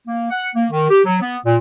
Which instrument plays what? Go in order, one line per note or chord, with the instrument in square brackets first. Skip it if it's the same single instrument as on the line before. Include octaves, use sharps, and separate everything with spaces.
[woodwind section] A#3
F#5
A#3
D#3
G4
F#3
B3
A#2